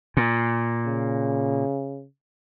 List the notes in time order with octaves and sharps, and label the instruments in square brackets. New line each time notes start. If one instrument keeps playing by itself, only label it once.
[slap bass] A#2
[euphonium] C#3